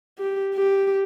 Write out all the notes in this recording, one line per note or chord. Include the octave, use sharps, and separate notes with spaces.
G4
G4